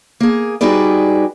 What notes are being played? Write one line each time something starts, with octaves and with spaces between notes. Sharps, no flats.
A#3 G#4
G3 D#4 F#4 G#4 B4 D5